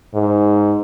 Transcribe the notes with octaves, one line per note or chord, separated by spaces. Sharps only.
G#2